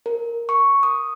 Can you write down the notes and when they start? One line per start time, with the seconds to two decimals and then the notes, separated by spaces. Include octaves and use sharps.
0.06 A#4
0.49 C#6
0.83 D#6